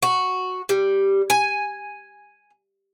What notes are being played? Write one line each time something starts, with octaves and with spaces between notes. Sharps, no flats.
F#4
G3
G#5